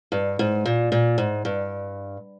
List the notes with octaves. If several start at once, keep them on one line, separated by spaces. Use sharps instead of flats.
G2
G#2
A#2
A#2
G#2
G2